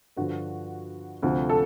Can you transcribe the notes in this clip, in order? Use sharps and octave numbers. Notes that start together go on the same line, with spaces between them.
G2 D3 F3 F#4
D2 C3 F3 A3
A4